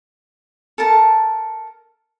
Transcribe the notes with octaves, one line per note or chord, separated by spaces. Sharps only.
A4 A#4 A5